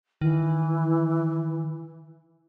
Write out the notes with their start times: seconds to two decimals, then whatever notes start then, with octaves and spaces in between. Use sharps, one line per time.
0.21 D#3 E3